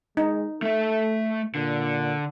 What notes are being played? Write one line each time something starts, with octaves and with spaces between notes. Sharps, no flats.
G#3 D#4
A3 A4 E5
A#2 D3